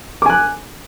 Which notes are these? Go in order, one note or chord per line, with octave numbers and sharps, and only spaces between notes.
G#5 D6 F#6